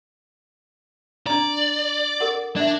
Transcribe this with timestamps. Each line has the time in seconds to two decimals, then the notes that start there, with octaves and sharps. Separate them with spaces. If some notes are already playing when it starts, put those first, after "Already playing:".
1.27 D4 D5 A#5
2.20 A4 A#4 F#5
2.56 D4 D5 E5